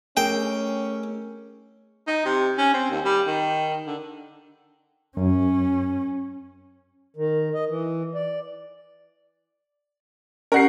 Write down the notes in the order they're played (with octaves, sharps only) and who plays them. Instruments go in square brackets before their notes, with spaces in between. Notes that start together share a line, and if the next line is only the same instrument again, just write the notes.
[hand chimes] A3 G#4 A#4 [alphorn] C#4 [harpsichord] G5
[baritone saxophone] D#4
C3
C#4
C4
D#2
G3
D#3
D3
[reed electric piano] F#2 [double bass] C#4
[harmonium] D#3
D#5
E3
D5
[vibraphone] C#4 G4 [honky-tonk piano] A#4 F#5 C7